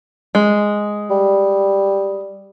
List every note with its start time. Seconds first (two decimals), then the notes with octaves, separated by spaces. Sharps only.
0.35 G#3
1.10 G3